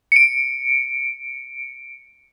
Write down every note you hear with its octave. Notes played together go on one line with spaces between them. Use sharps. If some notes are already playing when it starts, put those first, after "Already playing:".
C#7 D7